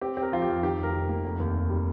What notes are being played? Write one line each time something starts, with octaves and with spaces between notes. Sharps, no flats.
C4 G4
C4 G4
A#4
F3 F4
G4
F2
D#3 G4
F1 A#4
D#3
A#3
F1
D#2
F1
G3